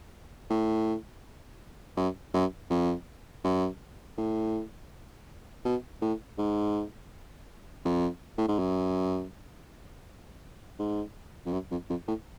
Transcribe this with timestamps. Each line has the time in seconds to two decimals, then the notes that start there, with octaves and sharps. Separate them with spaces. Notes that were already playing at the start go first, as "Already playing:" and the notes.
0.50 A2
1.97 F#2
2.34 F#2
2.70 F2
3.44 F#2
4.18 A2
5.65 B2
6.02 A2
6.38 G#2
7.85 F2
8.38 A2
8.48 G#2
8.59 F#2
10.79 G#2
11.46 F2
11.53 F#2
11.71 F2
11.90 F2
12.08 A2